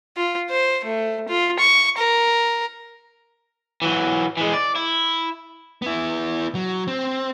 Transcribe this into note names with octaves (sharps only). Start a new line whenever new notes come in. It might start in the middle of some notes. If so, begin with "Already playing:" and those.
F4
C5
A3
F4
C#6
A#4
E3 F#3
E3 G#3
D5
E4
B3 E4
F#3
C4